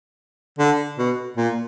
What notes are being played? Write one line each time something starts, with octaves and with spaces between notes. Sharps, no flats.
D3
B2
A#2